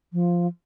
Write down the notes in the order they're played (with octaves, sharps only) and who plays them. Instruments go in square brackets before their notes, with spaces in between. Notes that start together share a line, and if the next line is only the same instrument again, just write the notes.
[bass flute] F3